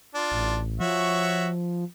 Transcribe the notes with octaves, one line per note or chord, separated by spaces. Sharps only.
D4 F4
A1
F3 F#4 C#5 E5